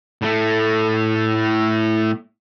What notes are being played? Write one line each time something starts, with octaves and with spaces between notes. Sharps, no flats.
A2 A3